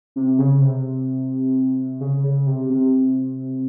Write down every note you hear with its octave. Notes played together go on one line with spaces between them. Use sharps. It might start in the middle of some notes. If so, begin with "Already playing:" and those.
C3
C#3
C3
C#3
C#3
C3
C3